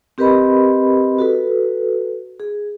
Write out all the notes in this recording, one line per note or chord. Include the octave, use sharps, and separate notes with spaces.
C4 G4 A#4 B4 D#5 B5
F#4 A4 B4
G#4